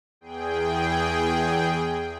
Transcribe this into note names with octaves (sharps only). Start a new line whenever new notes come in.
E2 G#4 G5